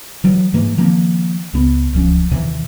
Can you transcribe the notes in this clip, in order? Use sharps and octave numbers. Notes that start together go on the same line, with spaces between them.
E3 F#3 G#3
G#2 E3 G#3 A#3
D#3 F3 A#3 C4
C#2 C#3 B3
D1 C#2 F3 C#4
D#2 C3 D#3 E3